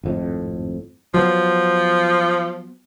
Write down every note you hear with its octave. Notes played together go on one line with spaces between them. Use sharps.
G#1 F2 A2
F3 F#3 B3